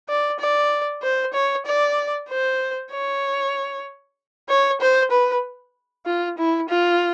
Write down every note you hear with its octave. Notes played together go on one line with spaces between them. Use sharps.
D5
D5
C5
C#5
D5
C5
C#5
C#5
C5
B4
F4
E4
F4